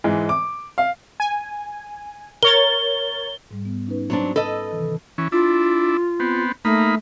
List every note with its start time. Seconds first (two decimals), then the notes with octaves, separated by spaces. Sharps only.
0.04 G#2 E3 G#3
0.29 D6
0.78 F5
1.20 G#5
2.43 A#4 C#5 A6 G7
3.51 G#2 G3
3.65 B3
3.87 C#4 D#4 B4
4.10 F#3 C4 D4 B5
4.36 A4 B4 D#5
4.72 C3 D#3 E3
5.18 E3 C#4
5.32 D4 E4 F4
6.20 B3 C4
6.65 A3 A#3 D#4 B5